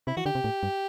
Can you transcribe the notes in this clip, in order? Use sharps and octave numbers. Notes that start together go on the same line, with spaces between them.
C3 E4
E3 F#4
D3 G4
C3
A2
G2